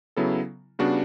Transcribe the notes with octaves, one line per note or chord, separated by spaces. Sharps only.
C#3 F#3 B3 E4 A4
C#3 G3 B3 D4 F#4